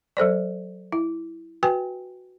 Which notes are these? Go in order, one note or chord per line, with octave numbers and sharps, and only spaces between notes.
F#3 A4 C5 D5
E4
F#4 B4 G5 G#5